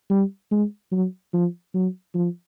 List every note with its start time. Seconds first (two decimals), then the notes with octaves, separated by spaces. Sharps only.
0.10 G3
0.51 G#3
0.92 F#3
1.33 F3
1.74 F#3
2.15 F3